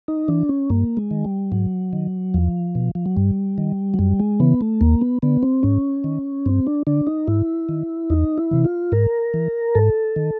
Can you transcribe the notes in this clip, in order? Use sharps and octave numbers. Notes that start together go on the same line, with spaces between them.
D#4
E3 D4
C#4
G2 A#3
G#3
D#3
G3
G#2 F#3
D#3
E2 F3
B2
F3
F#3
G2 G3
D#3
F#3
F#2 G3
G#3
C#3 E3 B3
A3
D#2 A#3
B3
D3 B3
C4
G#2 C#4
D#3
G2 C4
D4
D3 D4
D#4
G#2 E4
D#3
E2 D#4
E4
C3 E3
F4
G#2 A#4
E3
G#2 A4
D#3